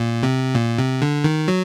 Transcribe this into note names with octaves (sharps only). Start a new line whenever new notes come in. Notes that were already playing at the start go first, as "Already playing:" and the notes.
Already playing: A#2
C3
A#2
C3
D3
D#3
F#3